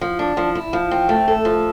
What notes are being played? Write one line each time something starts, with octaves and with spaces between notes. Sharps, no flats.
F3
D4
F3
E4
F3
C4
A3
A4
F3